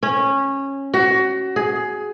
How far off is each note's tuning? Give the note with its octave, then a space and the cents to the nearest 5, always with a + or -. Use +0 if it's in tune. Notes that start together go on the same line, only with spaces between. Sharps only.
C#4 -15
F#4 +25
G#4 +15